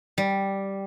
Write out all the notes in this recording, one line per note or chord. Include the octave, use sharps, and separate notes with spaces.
G3